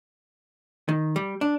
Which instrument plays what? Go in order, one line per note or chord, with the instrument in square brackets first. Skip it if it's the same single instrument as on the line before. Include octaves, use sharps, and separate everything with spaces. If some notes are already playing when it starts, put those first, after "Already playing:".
[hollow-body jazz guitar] D#3
G3
D4